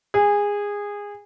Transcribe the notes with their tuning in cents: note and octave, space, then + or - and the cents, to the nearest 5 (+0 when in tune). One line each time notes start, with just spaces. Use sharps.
G#4 -20